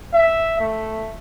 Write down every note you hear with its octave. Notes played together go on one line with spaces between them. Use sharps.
E5
A3